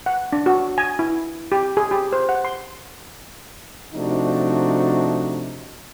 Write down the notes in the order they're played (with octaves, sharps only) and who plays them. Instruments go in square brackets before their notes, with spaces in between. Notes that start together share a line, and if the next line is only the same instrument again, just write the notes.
[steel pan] F#5
D4
F#4
G#5
E4
G4
G#4
G4
C5
F#5
C6
[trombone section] C3 F3 A3 D4 D#4 F#4